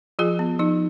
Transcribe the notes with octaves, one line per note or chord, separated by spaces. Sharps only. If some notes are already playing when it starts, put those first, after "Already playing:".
F3 F4 G#4
B3
F3 D#4